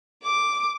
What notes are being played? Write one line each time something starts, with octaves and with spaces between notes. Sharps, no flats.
D6